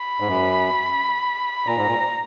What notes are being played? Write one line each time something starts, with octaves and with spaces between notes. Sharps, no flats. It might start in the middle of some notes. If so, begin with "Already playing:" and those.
Already playing: B5
G#2
F#2
A#2 A#5
G#2
A#2